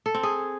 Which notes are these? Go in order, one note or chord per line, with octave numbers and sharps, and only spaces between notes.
A4
C4
G#4